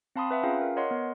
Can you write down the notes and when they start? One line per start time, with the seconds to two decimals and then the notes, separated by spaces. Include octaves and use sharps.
0.16 C4 F5 A5 B5 C6 D#6
0.31 B4 E5 F#5
0.43 C#4 F4 G#4 F5 G5 A#5
0.61 A#4
0.76 A#4 C#5 D#5 F#5 C6
0.91 B3